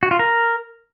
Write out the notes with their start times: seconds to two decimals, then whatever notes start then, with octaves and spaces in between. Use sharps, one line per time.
0.03 F#4
0.11 F4
0.19 A#4